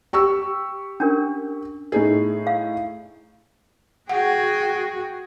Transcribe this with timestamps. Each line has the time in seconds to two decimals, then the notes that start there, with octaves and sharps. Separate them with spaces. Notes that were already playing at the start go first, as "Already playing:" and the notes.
0.13 G4 C#6 E6
1.00 C#4 D4 A#4
1.92 A2 D#4 G#4
2.47 F5
4.09 F#4 G#4 F#5 G5